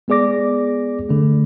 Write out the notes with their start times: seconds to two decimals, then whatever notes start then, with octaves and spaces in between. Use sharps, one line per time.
0.08 G#3 B3 G#4 D5 D6 A#6
1.09 D3 A3